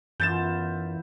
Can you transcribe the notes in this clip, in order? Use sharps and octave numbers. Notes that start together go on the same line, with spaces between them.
F#2 E3 B3 E4 F4 G6 A6 E7